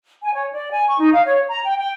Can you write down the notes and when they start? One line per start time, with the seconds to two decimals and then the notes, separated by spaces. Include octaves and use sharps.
0.22 G#5
0.34 C#5
0.52 D5
0.71 G#5
0.87 C#6
0.99 D#4
1.13 F5
1.25 C#5
1.48 A#5
1.65 G5
1.78 G5